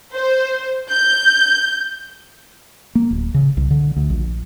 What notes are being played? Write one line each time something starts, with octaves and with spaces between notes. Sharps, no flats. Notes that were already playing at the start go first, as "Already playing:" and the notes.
C5
G6
A#3
D1
C#3
C2
D3
D2
A#1